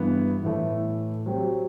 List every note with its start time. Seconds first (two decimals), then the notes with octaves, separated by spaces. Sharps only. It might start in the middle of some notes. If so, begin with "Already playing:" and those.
Already playing: G2 E3 B3
0.43 A2 E3 A3
1.26 F#3 C4 G4